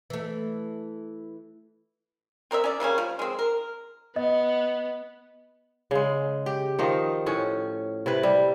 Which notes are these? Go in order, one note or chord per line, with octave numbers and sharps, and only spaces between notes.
E3 A3
C4 A#4 D5 E5
C#4 D5
C#3 G3 A#3 C#4
F3
G#3 C4
A#4
B3 D#5
C#3 G#3
G4
D#3 F3 D#4
A2 C#4
C3 E4 B4
G3